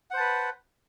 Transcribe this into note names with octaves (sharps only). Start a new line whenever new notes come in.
B4 C5 F#5 A5